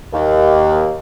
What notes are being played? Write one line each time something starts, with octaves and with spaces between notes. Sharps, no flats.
D#2